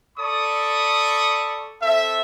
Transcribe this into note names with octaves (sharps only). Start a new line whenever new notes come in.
A4 D5 B5 C#6 D#6
C4 A4 E5